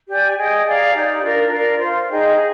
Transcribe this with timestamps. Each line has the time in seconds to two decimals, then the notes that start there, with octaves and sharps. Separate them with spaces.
0.08 G4 D5 G#5
0.37 G#4 D#5 G5
0.65 G#4 D5 F5 A#5
0.94 D#4 G4 D5
1.23 D4 F4 A#4
1.52 F4 A#4 D5
1.80 C5 F5 C6
2.09 D#4 G#4 D#5 G5
2.37 G#4